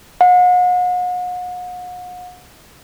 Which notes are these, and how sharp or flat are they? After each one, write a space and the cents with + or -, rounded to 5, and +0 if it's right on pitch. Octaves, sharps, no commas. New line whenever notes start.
F#5 -40